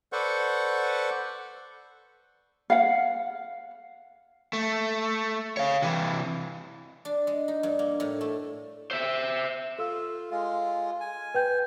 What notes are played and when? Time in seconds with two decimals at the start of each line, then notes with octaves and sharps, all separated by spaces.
0.13 A4 B4 C5 D5 F#5 C#6
2.70 F5 F#5
4.53 A3
5.57 C#5 F5
5.82 C3 E3
7.05 D4
7.27 G#3
7.48 D#4
7.63 G2
7.79 A#3
8.00 A2
8.21 A3
8.91 C5 E5
9.78 F4 A4 E6
10.31 G#3 F4
11.01 G#5
11.34 B4 G5 G6